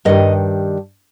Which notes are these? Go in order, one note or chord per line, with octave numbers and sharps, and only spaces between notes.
G2 D#3 G3 D#5